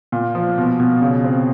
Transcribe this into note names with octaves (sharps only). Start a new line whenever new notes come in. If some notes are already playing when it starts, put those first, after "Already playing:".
A#2
F3
B2
B2
C#3
C4